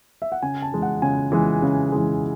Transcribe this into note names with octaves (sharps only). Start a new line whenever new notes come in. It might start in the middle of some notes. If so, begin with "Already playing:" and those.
E5
F#5
C#3 G#5
A5
E3 G#3
F#5
C#3 G#5
E3 G#3
C#3
E3 G#3